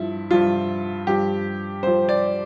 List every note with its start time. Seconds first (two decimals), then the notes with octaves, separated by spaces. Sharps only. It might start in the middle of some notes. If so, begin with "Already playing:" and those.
Already playing: G2 F3 E4
0.31 G2 F3 F4
1.07 G2 F3 G4
1.83 G2 F3 C5
2.09 D5